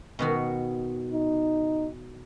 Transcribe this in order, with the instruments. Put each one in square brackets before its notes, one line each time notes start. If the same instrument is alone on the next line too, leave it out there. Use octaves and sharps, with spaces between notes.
[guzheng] B2 D#3 F#4
[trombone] D#4